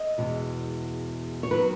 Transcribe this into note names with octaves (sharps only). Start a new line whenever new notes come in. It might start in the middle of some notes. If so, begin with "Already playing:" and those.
Already playing: D#5
E2 B2 G#3 C#4
C#5
D#3 F#3 B3 B4